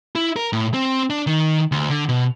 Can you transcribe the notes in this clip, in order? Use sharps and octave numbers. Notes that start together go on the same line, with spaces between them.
E4
A#4
A2
C4
D4
D#3
D2
D3
B2